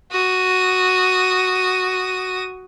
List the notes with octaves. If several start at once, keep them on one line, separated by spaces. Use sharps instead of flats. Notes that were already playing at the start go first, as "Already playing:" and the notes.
F#4 D#6